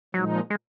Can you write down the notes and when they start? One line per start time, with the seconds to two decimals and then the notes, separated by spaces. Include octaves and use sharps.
0.14 A#2 F3 F#3 G#3 D#4
0.50 G#3